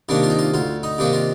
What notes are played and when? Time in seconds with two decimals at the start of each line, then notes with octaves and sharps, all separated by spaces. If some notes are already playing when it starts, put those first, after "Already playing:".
0.09 C3 D#3 A#3 D4
0.23 F4
0.30 D#4
0.39 F4
0.54 D2 F4
0.83 D#4
0.98 C3 D#3 A#3 D4
1.13 F4